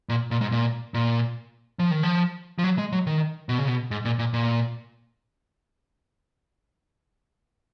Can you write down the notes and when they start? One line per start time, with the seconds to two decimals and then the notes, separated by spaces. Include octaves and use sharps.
0.09 A#2
0.31 A#2
0.41 G#2
0.52 A#2
0.94 A#2
1.79 F3
1.91 D#3
2.03 F3
2.59 F3
2.64 F#3
2.78 G#3
2.92 F#3
3.07 D#3
3.49 B2
3.58 C#3
3.68 B2
3.91 G#2
4.05 A#2
4.19 A#2
4.33 A#2